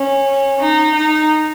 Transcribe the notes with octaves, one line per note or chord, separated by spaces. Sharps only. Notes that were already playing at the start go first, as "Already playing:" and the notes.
Already playing: C#4
D#4
D#4